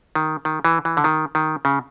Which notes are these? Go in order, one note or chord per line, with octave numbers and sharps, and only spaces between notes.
D#3
D#3
E3
E3
D3
D#3
D#3
C#3